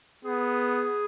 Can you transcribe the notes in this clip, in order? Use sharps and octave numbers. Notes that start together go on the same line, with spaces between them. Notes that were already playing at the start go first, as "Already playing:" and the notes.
B3 G#4